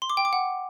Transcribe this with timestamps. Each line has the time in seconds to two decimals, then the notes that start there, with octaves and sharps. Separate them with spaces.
0.02 C6
0.10 D6
0.17 G5
0.25 D6
0.33 F#5